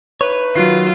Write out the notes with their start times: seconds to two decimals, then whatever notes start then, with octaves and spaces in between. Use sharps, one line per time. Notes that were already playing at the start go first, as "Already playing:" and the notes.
0.21 D#4 E4 B4 C#5
0.56 D#3 F#3 F4 F#6 C7